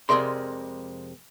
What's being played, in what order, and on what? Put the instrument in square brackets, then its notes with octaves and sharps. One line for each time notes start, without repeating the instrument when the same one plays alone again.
[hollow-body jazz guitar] F2 C3 G#3 A#4 D5 C6